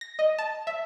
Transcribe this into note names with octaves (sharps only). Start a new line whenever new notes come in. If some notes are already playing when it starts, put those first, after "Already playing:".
A#6
D#5
A5
E5